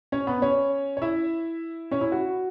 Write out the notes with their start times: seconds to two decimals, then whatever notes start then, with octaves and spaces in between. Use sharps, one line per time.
0.12 C#4 C#5
0.27 B3 B4
0.42 C#4 C#5
0.97 C#5
1.02 E4 E5
1.91 C#4 C#5
2.01 E4
2.12 F#4